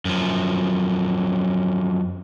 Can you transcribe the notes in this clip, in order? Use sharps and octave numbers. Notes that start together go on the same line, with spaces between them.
F#2 F3